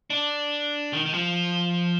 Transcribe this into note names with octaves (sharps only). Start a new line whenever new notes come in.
D4
D#3
D#3
F3